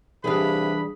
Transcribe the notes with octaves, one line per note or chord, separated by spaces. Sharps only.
C2 E3 G3 D4 G#4 B4 F5 B5